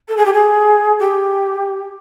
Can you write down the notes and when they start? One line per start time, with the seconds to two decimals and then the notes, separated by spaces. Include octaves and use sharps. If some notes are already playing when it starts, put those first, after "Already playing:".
0.08 A4
0.17 G#4
0.25 G4
0.33 G#4
0.99 G4